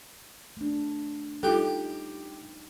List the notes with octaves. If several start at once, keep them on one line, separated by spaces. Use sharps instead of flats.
A3 D4
G3 D#4 F4 G4 A4